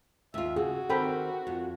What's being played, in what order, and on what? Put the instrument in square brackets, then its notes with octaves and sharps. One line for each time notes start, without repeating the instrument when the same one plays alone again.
[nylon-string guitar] D#2 F4 [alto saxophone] E5
[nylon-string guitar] C#3 [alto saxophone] F#4 [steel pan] G#4
[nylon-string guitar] D#3 C4 A#4 [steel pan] A4 G5 B5
[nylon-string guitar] F2